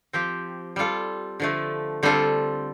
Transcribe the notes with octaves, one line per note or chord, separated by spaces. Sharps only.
F3 C4 G4
G3 F4 A4
D3 F3 A3
D3 G3 C4 F4 A4